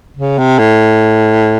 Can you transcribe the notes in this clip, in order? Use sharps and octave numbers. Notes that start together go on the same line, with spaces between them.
C#3
C3
A2